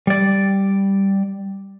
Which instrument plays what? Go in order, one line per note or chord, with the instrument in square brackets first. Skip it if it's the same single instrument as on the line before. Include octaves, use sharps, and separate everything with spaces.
[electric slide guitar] G3 D5